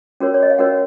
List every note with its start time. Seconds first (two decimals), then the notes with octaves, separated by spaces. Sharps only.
0.20 C#4 F#4 A#4 C#5
0.34 C#5
0.43 D#5
0.51 F5
0.58 C#4 F#4 A#4 C#5 F#5